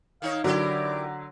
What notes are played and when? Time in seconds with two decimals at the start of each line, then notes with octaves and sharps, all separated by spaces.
0.22 D#3 D#4 C#5 F5
0.44 D3 F#3 E4 G4 A#4 D5